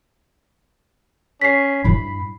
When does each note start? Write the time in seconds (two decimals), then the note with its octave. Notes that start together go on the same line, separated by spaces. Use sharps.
1.41 C#4 B6 C7
1.84 G2 E4 B5